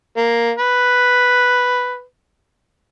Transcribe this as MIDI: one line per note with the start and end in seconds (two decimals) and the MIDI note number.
0.17 0.50 58
0.58 2.02 71